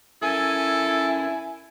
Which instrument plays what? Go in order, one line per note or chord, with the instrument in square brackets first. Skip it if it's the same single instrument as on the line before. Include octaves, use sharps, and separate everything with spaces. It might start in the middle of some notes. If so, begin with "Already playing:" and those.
[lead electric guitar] C#4 A#4 [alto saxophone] E4 [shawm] A4 [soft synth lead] G#5